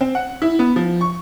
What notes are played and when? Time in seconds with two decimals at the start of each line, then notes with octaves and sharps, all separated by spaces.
0.01 C4
0.15 F#5
0.42 E4
0.59 B3
0.76 F3
1.01 C#6